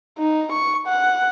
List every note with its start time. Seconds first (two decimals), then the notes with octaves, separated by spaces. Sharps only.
0.18 D#4
0.52 C#6
0.88 F#5